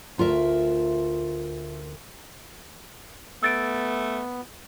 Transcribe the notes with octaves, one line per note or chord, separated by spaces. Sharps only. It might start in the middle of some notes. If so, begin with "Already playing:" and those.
D2 F4 A#4 E5
A3 B3 E6 A6 D7